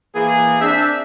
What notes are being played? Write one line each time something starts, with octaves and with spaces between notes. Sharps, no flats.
E3 A#3 G#4
C4 D4 E5